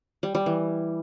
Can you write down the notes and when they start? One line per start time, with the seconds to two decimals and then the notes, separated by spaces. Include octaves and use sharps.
0.23 G3
0.35 G3
0.46 E3